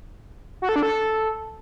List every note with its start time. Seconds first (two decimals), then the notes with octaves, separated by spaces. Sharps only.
0.62 F#4
0.69 A4
0.76 D4
0.83 A4